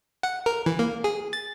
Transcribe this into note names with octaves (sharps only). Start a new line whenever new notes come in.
F#5
A#4
E3
A#3
G#4
A6